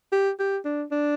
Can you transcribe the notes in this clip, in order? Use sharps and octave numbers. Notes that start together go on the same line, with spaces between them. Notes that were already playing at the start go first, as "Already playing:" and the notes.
G4
G4
D4
D4